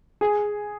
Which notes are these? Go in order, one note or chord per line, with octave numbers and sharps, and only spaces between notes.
G#4